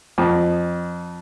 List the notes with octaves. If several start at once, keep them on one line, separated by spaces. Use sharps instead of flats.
F2